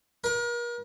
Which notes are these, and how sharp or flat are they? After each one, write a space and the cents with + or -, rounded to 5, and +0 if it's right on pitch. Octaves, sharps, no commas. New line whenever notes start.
A#4 +40